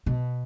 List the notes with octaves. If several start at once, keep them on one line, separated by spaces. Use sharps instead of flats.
B2